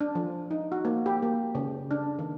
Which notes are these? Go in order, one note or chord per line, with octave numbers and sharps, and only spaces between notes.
D4
F3
D#4
F#4
A#3
G4
A#3
C#3
D4
D#3